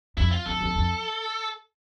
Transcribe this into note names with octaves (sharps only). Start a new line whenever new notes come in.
F2 E4
F4
F2 A4
F2
F2